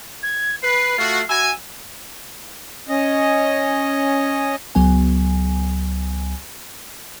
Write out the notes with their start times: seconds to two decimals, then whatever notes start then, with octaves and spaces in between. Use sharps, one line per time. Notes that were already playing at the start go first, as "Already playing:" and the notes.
0.23 G#6
0.62 B4 C7
0.98 A3 F4 F#4
1.29 F#4 E5 G#5
2.89 C#4 D#5
4.75 C#2 F#3 B3 G#5